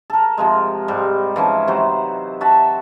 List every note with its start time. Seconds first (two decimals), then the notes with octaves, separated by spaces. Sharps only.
0.10 A4 A#4
0.38 C3 F3 G#3
0.88 G#2 G3
1.36 E3 F3 C#4 D#4
1.68 C3 F#3 C5
2.41 F#4 E5 A5